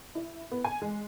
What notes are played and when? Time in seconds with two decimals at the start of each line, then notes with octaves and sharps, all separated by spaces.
0.15 E4
0.51 B3
0.64 G#5
0.82 G#3